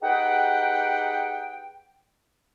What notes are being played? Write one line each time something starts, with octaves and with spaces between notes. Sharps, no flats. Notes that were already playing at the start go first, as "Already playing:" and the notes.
D#4 G4 G#4 B4 F#5 G5